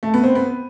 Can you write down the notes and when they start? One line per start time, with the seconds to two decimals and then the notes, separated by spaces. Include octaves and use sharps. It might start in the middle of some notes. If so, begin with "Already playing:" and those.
0.03 A3
0.14 B3
0.24 C4
0.35 B3